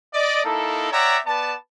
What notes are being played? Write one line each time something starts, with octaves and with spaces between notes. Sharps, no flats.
D5 D#5
A#3 D#4 E4 A4
C#5 D5 E5 F#5 G5 A#5
B3 B4 D5 A5